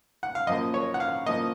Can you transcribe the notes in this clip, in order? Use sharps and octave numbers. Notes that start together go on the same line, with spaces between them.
F#5
F5
F#2 F3 A#3 D#5
C#5
F#5
F5
F3 A#3 D#5